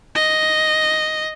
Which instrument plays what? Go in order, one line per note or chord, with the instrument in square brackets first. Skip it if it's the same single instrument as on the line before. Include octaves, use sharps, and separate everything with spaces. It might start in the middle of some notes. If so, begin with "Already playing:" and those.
[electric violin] D#5